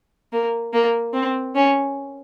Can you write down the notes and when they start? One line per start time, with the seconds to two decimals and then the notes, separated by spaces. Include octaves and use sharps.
0.32 A#3
0.73 A#3
1.13 C4
1.55 C#4